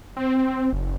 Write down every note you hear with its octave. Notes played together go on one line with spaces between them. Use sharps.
C4
F#1